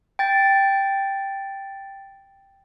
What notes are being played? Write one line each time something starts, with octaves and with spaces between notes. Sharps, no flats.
G5 A6